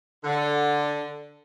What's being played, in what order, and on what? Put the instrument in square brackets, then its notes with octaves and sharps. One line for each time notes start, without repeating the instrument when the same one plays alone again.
[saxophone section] D3